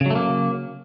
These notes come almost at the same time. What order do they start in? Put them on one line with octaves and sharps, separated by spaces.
C#3 F#3 A3 A#3